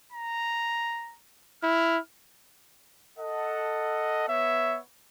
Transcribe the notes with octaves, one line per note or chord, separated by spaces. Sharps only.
A#5
E4 F6
A4 D#5 F#5
B3 C#5 E5